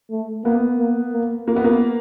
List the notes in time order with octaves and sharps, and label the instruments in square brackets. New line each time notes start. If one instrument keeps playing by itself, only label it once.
[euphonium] A3
[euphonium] A#3 [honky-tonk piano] B3
[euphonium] A#3
A#3
[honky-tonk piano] A#3
B3
A#3